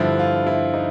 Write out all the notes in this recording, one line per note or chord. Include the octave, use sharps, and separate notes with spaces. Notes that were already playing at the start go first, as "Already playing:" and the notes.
Already playing: G2 D3 F3 E4
F4
E4
D#4